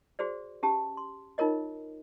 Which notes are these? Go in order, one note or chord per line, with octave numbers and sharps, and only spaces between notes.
F#4 G#4 C5 D5
C#4 G4 A5
C6
D#4 F4 A#4 C#5 D#5